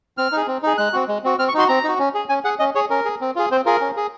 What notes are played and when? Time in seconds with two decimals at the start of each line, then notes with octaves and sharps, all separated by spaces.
0.18 C4 F6
0.32 D#4 G#4
0.48 C4
0.63 D#4 G#4
0.78 G#3 F#6
0.93 C4 F#4
1.08 G#3
1.24 C4 F#4
1.39 C4 F6
1.49 C#6
1.54 D#4 F#4 C6
1.68 C4 A#5
1.84 D#4 F#4
1.99 C#4
2.14 G#4
2.29 C#4 G#5
2.44 G#4 F#5
2.59 C#4 D#5
2.75 G#4 C#5
2.90 C#4 A#4
3.05 G#4
3.21 C4
3.36 F4 G#4
3.51 C4 C5
3.66 F4 G#4 A#4
3.81 C#4
3.97 G#4